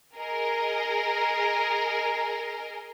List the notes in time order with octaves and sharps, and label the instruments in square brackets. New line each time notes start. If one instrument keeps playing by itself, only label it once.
[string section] G#4 A#4 D#5